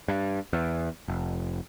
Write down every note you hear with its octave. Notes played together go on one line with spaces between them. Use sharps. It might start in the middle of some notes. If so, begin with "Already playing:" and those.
G2
E2
F1